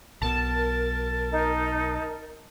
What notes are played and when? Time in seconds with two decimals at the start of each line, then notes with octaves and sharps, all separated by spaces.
0.22 B1 B2 A#4 A5
1.31 D#4